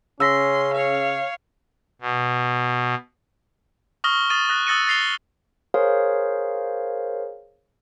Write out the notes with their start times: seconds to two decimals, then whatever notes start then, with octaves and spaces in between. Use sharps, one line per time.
0.20 C#3 C#4 C6 E6 A#6 B6
0.73 C#5 F5
2.01 B2
4.04 C#6 D#6 F6 A#6 G7
4.30 D#6 A6 D#7
4.49 D#6 F#6 A#6
4.67 D#6 E6 A6 A#6 C#7 D#7
4.87 A6 A#6 C7 F7 G7
5.74 G#4 A#4 C5 C#5 F5